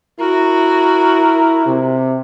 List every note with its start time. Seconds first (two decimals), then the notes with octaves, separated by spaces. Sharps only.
0.20 E4 F#4 A#4
1.66 C3